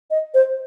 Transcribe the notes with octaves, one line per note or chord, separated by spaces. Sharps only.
D#5
C5